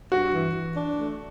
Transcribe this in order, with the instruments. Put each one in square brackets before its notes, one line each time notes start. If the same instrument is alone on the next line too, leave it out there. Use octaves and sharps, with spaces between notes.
[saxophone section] G2 [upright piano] F#4
[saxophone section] E3
E3
D4
A3